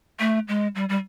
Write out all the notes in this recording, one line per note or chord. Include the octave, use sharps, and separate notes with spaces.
A3
G#3
G3
G3